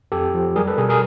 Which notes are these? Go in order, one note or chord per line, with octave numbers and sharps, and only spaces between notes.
F2 G4 A4
F3
G3 G#4 A#4
A4 B4
B2 G#4 A#4
G#4 A#4